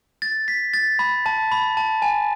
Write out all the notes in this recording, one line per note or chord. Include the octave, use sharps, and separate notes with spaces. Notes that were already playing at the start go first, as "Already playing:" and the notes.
A6
B6
A6
B5
A5
B5
A5
G#5